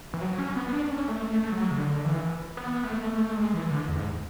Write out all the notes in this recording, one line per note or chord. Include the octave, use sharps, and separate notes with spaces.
E3
F#3
C#4
B3
D4
C#4
A3
A3
F#3
C#3
D3
E3
B3
A3
A3
A3
G#3
E3
D3
E2
G#2